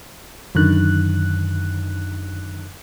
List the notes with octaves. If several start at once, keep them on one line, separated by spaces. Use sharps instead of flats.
F#2 D3 D#3 F#6